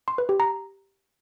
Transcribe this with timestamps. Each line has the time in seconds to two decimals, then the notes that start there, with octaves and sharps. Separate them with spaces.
0.08 C6
0.18 B4
0.29 G4
0.40 A#5